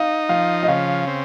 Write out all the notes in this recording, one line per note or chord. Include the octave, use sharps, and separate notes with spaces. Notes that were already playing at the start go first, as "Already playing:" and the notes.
Already playing: D#4 F5
F3 F5
D#5
C#3 F5
C4